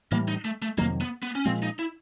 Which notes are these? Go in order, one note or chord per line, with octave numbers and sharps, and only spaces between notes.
A2 E3 G3 A#3
D#4
A3
A3
F2 C3 D#3 F#3 A#3
B3
B3
C#4
A#2 F3 G#3 C4
D#4
E4